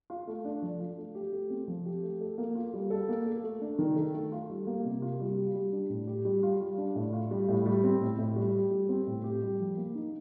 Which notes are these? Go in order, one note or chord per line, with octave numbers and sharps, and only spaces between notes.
F4
A3
D4
F3
F4
A3
G4
A3
C4
F3
G4
A3
A4
A#3
F4
G3
A4
A#3
A4
A3
D4
D#3
A4
A3
F4
G3
A#3
C3
F4
G3
G4
G3
D4
A2
G4
G3
F4
G3
D4
A2
F4
G3
A2
G3
C4
A2
A2
G3
G4
G3
C4
A2
G4
G3
F3
A#3
D#4